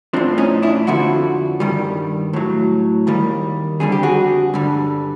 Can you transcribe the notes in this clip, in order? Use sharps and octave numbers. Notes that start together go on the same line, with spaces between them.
A2 F3 C4 D4
C#4 D#4
D4 E4
F2 D3 F3 E4 F#4
G2 D#3 G3
A2 F#3
D#2 D#3 G3
F2 D3 G3 G#4
G4
F#4 G#4
G2 D3 G3